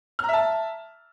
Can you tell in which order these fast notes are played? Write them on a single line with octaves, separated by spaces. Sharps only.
F6 A#5 E5 A5